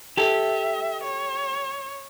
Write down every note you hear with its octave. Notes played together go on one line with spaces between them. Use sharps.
G4 A4 E5
C#5